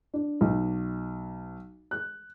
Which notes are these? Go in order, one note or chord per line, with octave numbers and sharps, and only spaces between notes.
D4
B1
F#6